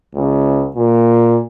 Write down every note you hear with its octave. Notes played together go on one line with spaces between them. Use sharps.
C#2
A#2